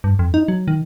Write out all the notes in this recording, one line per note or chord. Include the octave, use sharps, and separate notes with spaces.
G2
F2
D#4
F#3
D#3